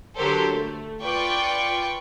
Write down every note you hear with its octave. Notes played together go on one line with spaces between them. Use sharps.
D3 F#3 G4 A4 A#4 C5
A3
F4 B4 D5 G5 C#6 D6